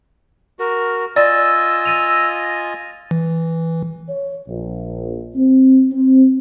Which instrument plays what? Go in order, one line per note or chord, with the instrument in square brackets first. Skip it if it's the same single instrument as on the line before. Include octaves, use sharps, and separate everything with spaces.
[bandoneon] F#4 [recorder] A#4
[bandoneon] F4 D#5 G#5 [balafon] D5 [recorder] E6 [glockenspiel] A6
[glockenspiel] A#6 D#7 F7
[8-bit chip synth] E3
[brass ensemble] C#5
A#1
C4
C4